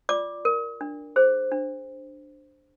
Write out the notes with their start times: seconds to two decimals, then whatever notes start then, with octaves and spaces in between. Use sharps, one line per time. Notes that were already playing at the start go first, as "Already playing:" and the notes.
0.09 F4 D5 D6
0.45 A#4
0.81 D4
1.16 G#4 C5
1.51 D4